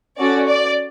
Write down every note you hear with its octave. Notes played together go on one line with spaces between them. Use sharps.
C#4 F#4 A4 D5
D5